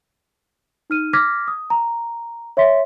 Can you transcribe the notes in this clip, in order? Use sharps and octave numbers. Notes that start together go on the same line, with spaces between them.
D#4 F6 D#7
D6 F6 G#6 A#6 B6
D#6
A#5
C#5 E5 C6 B6